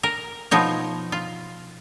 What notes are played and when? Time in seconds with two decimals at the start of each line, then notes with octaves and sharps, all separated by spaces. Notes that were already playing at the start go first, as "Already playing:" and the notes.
0.03 A#4
0.51 B2 F3 D#4 C#5
1.12 F4